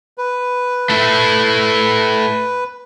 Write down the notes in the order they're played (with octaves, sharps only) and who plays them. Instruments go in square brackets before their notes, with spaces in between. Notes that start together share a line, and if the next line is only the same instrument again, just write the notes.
[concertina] B4
[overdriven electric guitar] A3 E4